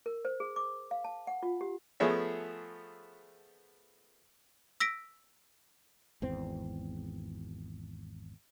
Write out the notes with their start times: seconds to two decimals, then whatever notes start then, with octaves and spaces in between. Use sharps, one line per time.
0.06 A#4
0.25 C5
0.40 G#4
0.56 D6
0.91 F5
1.04 A5
1.27 F#5
1.43 F4
1.61 G4
2.00 F3 A3 B3 G#4 C#5 E5
4.80 E6 A#6 B6 D7
6.22 G#1 E2 C4